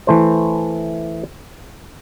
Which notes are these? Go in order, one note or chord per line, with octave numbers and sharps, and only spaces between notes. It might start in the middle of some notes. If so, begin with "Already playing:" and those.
E3 A3 C5